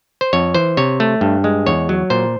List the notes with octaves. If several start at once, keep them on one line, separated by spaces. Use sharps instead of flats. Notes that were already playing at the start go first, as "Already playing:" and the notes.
C5
F2 C#5
E3 C5
C3 C#5
A3
G2
G#3
E2 C#5
F#3
A#2 C5